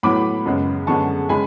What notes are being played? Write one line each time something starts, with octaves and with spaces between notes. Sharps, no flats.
A2 F#3 B3 B5 D6
F#2 C#3 G#3 B3
F#2 D3 G#3 B3 A5 C#6
C#3 G#3 B3 G#5 B5